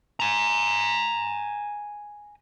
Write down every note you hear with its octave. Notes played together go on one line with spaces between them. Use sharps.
G#5 A#5